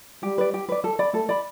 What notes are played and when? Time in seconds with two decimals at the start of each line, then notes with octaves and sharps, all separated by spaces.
0.23 G3 G4
0.38 B4 D5
0.54 G4
0.69 B4 D5
0.84 A4
0.99 D5 B5
1.14 A3 A4
1.29 D5 B5